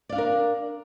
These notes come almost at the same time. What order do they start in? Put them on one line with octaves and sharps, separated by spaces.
D5 F5 D4 A#4